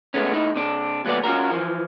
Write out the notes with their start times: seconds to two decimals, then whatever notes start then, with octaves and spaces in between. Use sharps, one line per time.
0.14 C#2 A#2 G#3 A3 B3 C#4
0.32 A2 D#4 E4
0.56 C3 D4
1.05 D#2 F#3 A3 B3 D5
1.24 C#4 F4 F#4 A#4
1.51 E3 F3